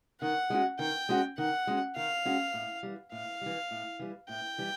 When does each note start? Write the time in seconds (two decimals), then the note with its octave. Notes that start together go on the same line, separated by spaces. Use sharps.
0.21 D#3 F#5
0.50 G#3 C#4 F#4
0.79 D#3 G5
1.09 G#3 C#4 F#4
1.38 D#3 F#5
1.67 G#3 C#4 F#4
1.96 D#3 F5
2.25 G#3 C#4 F#4
2.54 A2
2.83 E3 G3
3.12 A2 F5
3.41 E3 G3
3.71 A2
3.99 E3 G3
4.29 A2 G5
4.58 E3 G3